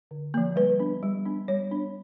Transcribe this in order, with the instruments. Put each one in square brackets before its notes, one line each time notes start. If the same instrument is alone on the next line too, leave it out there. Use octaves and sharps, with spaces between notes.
[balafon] D3
F3 A#3
G3 B4
B3 D4
G3
B3 D4
G3 C#5
B3 D4